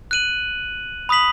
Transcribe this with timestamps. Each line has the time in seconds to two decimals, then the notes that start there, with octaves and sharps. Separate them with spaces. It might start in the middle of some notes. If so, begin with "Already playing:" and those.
0.11 F#6 D#7 F#7
1.09 B5 D#6 B6 F#7